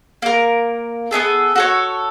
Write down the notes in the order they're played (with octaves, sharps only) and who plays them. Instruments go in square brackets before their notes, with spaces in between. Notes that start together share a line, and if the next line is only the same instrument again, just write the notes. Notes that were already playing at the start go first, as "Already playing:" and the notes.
[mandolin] A#3 A#4
B3 C#4 G#4 A4
F#4 A4 C#5